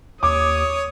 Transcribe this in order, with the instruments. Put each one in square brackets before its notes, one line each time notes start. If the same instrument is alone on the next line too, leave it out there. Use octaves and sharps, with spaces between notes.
[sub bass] D#2 [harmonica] C#5 [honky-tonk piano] D6 [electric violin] D#6